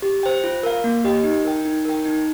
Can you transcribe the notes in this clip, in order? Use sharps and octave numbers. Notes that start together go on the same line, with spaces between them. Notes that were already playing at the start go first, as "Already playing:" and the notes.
G4
C5 G5
F4
A#4 F5
A#3
G4 D#5 G5
D#4
A#4 G5
D#4
A#4 G5
D#4